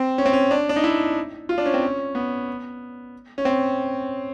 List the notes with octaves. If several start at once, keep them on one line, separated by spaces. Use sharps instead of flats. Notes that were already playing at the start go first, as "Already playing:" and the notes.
Already playing: C4
C#4
C4
C#4
D4
D4
D#4
E4
F4
D4
C#4
C4
C#4
B3
C#4
C4